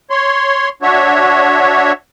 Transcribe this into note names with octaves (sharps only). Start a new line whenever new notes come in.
C#5 C6
D4 F#4 C#5 E5